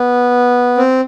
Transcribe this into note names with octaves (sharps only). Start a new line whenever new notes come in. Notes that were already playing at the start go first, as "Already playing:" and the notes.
Already playing: B3
C4